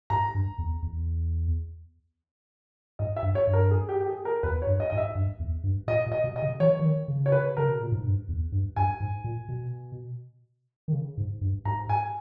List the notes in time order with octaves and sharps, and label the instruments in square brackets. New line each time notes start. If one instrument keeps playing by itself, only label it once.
[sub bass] G#2 [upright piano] A#5
[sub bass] G2
E2
E2
[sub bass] G#2 [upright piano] D#5
[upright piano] E5
[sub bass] G2
[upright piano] C#5
[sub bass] G2
[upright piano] A#4
G#4
G4
G4
G#4
A#4
[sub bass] E2 [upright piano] B4
[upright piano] C#5
[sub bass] G2
[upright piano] D#5
[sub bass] G#2 [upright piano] D#5
[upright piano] E5
[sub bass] G2
E2
G2
[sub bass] A#2 [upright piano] D#5
[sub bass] A#2
[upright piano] D#5
[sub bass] B2
[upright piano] D#5
[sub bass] C#3
[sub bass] E3 [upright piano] C#5
[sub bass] E3
D#3
C#3
[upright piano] C#5
B4
[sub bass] C#3 [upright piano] A#4
[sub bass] B2
A#2
G#2
G2
E2
G2
[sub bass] G2 [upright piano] G#5
[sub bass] G#2
A#2
B2
D#3
C#3
G#2
G2
[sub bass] G#2 [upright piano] A#5
[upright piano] G#5